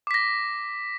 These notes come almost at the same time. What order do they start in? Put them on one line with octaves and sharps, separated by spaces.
D6 B6 A#6